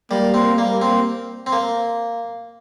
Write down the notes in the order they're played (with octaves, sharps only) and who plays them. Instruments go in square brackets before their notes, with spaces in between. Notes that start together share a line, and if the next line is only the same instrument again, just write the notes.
[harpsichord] G3 [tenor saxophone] A#3
[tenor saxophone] A#3 [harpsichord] C4
[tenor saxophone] G3 [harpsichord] A#3
[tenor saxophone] A#3 [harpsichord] C4
[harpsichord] C4
A#3